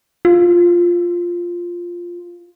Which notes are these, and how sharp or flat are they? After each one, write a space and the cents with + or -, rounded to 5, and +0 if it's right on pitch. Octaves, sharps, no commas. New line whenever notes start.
F4 +0